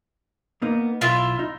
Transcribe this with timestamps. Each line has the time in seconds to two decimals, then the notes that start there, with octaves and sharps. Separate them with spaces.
0.62 A#3 B3 D#4
1.01 B1 E4 F4 E5
1.39 D#4